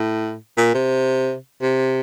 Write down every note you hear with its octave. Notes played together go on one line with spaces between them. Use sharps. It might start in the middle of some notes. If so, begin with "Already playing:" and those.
Already playing: A2
A#2
C3
C3